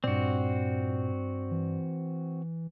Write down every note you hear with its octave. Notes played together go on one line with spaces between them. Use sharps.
G2 A#2 C4 F#4 D5
E3